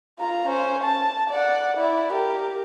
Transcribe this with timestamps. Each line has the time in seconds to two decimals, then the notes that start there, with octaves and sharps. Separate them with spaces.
0.19 F4 A#5
0.48 C#4 C5
0.84 A5
1.30 D5 F#5
1.77 E4 D5
2.12 G4 A#4